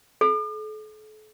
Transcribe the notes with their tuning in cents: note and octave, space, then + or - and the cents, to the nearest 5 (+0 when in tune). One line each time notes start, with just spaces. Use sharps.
A4 -40